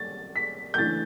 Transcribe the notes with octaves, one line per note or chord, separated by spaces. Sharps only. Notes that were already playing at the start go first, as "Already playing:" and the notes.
Already playing: G3 C#4 A6
B6
G6
C#3 E3 A3 D4 A6